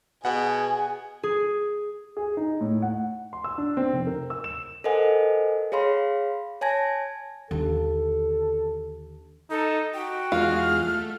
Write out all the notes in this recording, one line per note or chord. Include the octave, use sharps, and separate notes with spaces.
B2 G#4 F#5
G#4
G#4
D#4
A2
F#5
C6
E6
D4
C4
F1
A#4
E6
E7
A4 A#4 C5 D#5 F#5 G#5
G#4 C#5 F5 B5 C6
C#5 G#5 A5 G#6 A#6
D#2 D3 A4
D#4 A4
F#4 G5
E2 G#3 F4 F6
A3